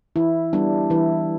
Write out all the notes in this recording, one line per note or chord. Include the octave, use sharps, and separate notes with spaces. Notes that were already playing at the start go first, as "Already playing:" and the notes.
E3 E4
G3 B3 D4
E3 E4